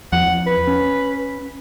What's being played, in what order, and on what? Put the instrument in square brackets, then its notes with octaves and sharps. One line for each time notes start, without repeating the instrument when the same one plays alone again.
[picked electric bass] E2 F3 [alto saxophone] F#5
[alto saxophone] B4
[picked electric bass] C#4